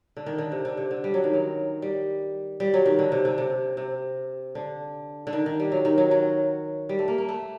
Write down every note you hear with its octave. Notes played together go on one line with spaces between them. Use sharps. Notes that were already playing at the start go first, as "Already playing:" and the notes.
D3
D#3
D3
C3
D3
C3
D3
G3
F#3
D#3
F#3
G3
G3
F#3
D#3
D3
C3
D3
C3
C3
D3
D3
D#3
D#3
G3
F#3
D#3
F#3
F#3
G3
A3
A#3
A#3
A3